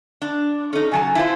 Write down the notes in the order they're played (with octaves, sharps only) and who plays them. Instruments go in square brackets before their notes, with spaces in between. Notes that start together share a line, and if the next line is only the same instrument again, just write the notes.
[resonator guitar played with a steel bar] D4
[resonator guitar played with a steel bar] C#4 D#4 [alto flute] A4
[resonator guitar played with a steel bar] C#3 F#3 A5 [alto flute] G#5
[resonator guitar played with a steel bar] E4 F4 C5